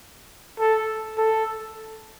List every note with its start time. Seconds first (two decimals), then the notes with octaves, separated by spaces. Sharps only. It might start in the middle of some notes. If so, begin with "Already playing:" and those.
0.59 A4
1.18 A4